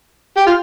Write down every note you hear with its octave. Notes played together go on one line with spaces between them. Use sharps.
G4
F4